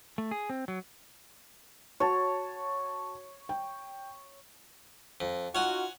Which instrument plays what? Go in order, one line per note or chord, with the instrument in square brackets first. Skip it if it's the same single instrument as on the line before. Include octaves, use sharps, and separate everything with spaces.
[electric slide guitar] A3
G#4
C4
F#3
[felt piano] F#4 A5 [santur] C#5
[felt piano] G5
[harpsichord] F2
[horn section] D#4 F4 F#4 [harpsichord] C#5 F#5 G#5